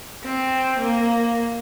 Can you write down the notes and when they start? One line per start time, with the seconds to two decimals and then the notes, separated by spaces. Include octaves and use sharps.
0.24 C4
0.79 A#3